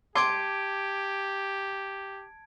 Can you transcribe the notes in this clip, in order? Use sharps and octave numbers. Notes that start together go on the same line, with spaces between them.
G4 A5 C6 D6 G#6 D7